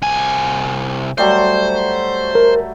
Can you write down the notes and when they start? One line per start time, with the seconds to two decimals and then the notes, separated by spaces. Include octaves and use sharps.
0.02 C2 G#5
1.18 F#3 G3 A3 C5
2.35 A#4